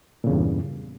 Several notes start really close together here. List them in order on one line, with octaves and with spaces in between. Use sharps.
A#2 C#3 E2 G2